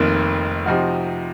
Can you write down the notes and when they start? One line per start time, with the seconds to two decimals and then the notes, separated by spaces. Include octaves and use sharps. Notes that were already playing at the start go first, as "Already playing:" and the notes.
Already playing: F1 F2 D#3 A#3
0.66 C3 F3 C4 D#4 F#4